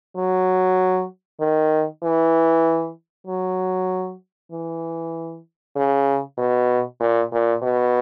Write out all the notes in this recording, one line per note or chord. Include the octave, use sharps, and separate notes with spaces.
F#3
D#3
E3
F#3
E3
C#3
B2
A#2
A#2
B2